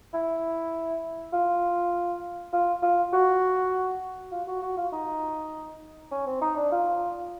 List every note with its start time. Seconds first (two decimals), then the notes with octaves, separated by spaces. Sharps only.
0.13 E4
1.33 F4
2.53 F4
2.83 F4
3.13 F#4
4.32 F4
4.47 F#4
4.62 F#4
4.77 F4
4.93 D#4
6.11 C#4
6.27 C4
6.42 D#4
6.57 D4
6.72 F4